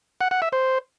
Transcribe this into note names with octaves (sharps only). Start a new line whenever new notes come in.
F#5
F#5
E5
C5